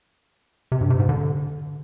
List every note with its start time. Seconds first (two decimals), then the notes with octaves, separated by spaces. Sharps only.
0.72 C3
0.81 G2
0.90 C3
1.00 G#2
1.09 D3